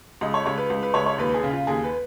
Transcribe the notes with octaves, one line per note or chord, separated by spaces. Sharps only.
C#2 D#5
C#5
C#2 C#5
B4
C#2
B4
C#2 C#5
C#5
D#2 B4
G#4
C#3
F4
D#2 G#4
B4